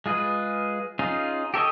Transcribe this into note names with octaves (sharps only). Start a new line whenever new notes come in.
G#3 F4 G#4 B4
C#4 D#4 F4 G#4
G4 A4 C#5 D#5